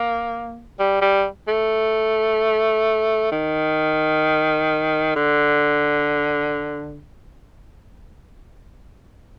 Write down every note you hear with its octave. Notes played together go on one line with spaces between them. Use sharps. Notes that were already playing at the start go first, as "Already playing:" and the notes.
Already playing: A#3
G3
G3
A3
D#3
D3